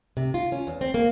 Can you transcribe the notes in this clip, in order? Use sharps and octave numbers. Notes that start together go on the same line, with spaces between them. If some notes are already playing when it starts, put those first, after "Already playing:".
C3
F4
C#4
E2
C4
A#3